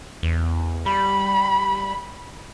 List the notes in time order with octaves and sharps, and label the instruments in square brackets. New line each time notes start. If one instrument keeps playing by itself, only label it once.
[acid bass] E2
[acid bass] G3 [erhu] B5